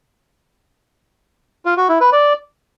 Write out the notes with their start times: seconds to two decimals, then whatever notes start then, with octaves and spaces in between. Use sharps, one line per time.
1.65 F4
1.77 F#4
1.89 E4
2.01 B4
2.12 D5